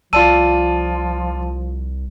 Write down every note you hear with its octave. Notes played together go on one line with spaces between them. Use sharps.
C2 F3 F4 D5 A5 E6 D#7